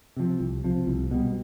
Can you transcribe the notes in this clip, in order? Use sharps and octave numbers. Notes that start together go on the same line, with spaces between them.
C3 F3
C2
C3 F3
C2
B2 G3